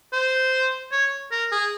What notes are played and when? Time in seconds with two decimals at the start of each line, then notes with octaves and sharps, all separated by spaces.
0.12 C5
0.92 C#5
1.31 A#4
1.51 G#4